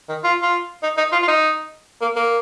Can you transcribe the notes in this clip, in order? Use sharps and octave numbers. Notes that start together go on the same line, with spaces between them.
D#3
F4
F4
D#4
D#4
F4
F4
D#4
A#3
A#3